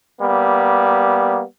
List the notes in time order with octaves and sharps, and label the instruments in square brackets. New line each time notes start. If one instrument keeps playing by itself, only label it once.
[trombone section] G3 A#3 B3